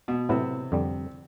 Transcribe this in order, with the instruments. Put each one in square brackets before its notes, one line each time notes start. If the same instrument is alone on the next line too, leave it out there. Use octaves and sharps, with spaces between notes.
[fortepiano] B2
[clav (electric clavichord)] A2 F#3 B3 E4 [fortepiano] C3
[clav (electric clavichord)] F2 D3 G3